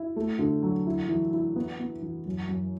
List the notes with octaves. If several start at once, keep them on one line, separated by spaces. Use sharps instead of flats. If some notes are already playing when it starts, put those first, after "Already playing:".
Already playing: E4
A3
D3
F#3
E4
E3
E4
B3
B3
E3
F#2
F#2